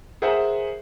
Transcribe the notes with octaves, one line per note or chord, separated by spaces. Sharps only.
G#4 A#4 C5 E5 F#5